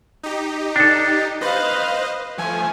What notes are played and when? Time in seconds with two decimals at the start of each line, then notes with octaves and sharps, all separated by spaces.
0.23 D#4 G4
0.76 D4 A4
1.41 B4 C5 D#5 F5
2.38 F3 A3 G#5